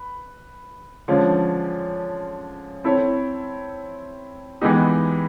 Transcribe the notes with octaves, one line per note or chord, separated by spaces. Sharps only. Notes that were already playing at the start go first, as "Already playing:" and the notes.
Already playing: B4
D3 F3 G#3 C#4 F4
C4 E4 A4 C#5
E3 G#3 B3 D#4 G4